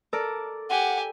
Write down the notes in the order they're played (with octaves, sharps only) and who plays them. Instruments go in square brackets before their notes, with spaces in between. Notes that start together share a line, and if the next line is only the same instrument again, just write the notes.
[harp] A4 A#4 D5
[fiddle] G4 G#5 [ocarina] F#5